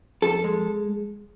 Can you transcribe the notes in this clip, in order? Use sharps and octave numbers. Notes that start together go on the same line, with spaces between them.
F2 A4
G#3